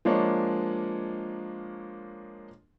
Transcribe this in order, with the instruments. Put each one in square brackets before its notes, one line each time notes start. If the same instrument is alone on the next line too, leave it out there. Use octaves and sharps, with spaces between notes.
[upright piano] F3 G#3 A#3 D4 C#5